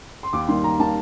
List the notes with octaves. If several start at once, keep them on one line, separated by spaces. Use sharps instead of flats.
C6
D#2 D6
D#3 G3 A#3 C6
D#2 A#5
D#3 G3 A#3 A5